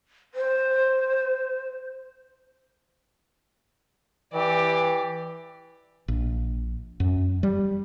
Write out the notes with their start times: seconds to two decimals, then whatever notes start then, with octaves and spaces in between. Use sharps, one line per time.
0.34 C5
4.34 E3 G4 D5
6.08 A#1
7.00 F#2
7.43 G3